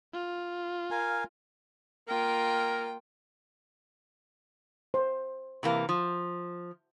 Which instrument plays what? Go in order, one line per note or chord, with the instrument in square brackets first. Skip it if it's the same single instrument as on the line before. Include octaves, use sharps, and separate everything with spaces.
[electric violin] F4
[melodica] A#4 F5 G#5
[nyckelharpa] A#3 F4 [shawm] A#4 [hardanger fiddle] G5
[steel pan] C5
[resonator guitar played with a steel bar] C3 E3 A#3
F3